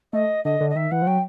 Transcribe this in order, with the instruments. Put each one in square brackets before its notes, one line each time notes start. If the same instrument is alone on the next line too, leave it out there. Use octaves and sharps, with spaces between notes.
[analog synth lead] A3 [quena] D#5
[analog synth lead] D3 [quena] D#5
[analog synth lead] D3
[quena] D#5
[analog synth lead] D#3 [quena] E5
[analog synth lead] E3 [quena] F#5
[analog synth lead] F3
[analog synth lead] F#3 [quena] G5